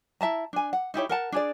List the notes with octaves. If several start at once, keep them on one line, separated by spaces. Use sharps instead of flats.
E4 E5 A5 A#5
D4 G#5
F#5
D#4 E4 G4 C#5
A#4 F#5 A5
D4 G#4 D5